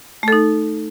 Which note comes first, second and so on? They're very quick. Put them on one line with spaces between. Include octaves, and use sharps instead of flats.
A3 A4 D#4